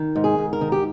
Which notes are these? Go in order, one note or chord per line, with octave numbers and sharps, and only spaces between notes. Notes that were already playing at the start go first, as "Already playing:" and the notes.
Already playing: D#3
G#2
G#4
G#2
A#4
D#3
G4